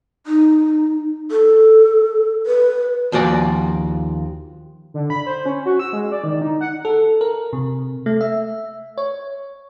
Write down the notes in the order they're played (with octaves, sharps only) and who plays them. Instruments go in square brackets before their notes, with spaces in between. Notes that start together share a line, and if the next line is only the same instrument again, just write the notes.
[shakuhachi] D#4
A4
B4
[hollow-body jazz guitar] D#2 F3 F#4 D5 G#5
[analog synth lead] D3
B5
C5
C#4
F#4
E6
G#3
D5
D#3
D#4
F#5
[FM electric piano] A4
A#4
C3
A3
E5
C#5